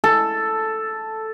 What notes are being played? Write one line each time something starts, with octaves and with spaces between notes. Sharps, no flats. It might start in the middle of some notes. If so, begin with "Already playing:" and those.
A4